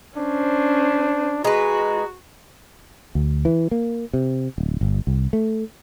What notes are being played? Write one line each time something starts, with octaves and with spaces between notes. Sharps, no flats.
C#4 D4 C5
G#3 F#4 B4 A#5
D2
E3
A#3
C3
D1
G1
C2
A3